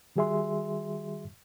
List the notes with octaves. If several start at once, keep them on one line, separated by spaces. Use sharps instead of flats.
D#3 G3 F#4 G#4 E5 C6